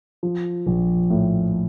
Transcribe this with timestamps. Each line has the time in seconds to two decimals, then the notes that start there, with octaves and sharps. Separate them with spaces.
0.23 F3
0.67 A#1
1.10 A2